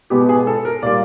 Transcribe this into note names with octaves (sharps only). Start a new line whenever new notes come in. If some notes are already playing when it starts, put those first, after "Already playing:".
B2 G#3 B3 G4
G#4
A4
A#4
A#2 G3 A#3 D5